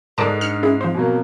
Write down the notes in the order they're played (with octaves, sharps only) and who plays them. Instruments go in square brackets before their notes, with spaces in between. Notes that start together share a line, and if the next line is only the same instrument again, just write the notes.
[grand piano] G#2 G#3 [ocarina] A4 [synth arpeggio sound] A#4 D5 A5
[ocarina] D4 [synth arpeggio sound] F6 C#7
[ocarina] C#4 [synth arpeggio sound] E4 G#4
[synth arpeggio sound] F3 C5 [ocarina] C4
[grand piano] B2 F#3 A#3